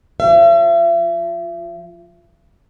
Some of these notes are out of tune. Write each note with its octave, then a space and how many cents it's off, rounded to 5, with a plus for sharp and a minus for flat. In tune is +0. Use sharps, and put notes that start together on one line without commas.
F3 +0 E5 +40